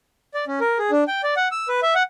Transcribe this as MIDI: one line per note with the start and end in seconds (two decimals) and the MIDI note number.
0.34 0.45 74
0.48 0.60 61
0.61 0.78 70
0.79 0.91 68
0.91 1.04 62
1.08 1.22 79
1.23 1.34 74
1.37 1.48 78
1.52 1.68 88
1.68 1.80 71
1.83 1.94 76
1.95 2.03 78